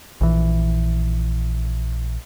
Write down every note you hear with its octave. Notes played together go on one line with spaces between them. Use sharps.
A#1 E3